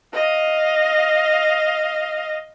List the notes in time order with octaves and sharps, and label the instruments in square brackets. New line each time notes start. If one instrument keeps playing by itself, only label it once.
[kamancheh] D#5 F5